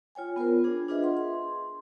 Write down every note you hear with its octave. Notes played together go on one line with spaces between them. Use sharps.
F4 C#5 G5 G#5
B3 F4 A#4 C5
D4 G#4
D4 F4 G#4 B4 D#5 E5
F4 F#5 C6
C6